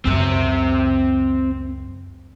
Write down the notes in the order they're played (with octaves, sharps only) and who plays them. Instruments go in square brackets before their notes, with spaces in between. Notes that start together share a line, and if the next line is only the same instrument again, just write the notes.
[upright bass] C#2 F#2 [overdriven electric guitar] C4 E5